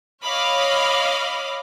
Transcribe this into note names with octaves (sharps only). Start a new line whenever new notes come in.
C#5 D#5 F5 B5 D6 F6